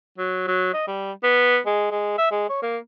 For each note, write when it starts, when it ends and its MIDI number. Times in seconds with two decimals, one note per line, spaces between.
0.18 0.43 54
0.48 0.70 54
0.74 0.87 75
0.87 1.12 55
1.23 1.59 59
1.66 1.88 56
1.91 2.16 56
2.18 2.29 76
2.31 2.49 56
2.50 2.62 73
2.62 2.78 58